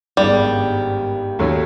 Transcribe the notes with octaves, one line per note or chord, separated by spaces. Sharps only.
G#1 G2 D#3 G3 G#3 B3
D#2 D#3 F#3 A3